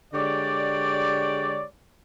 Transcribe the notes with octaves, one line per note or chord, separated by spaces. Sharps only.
D3 G#3 G4 C#5 D5